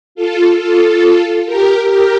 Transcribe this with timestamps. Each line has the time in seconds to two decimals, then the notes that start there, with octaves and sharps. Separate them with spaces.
0.15 F4 A4
0.58 F4 A4
1.46 G4 A#4
1.89 G4 A#4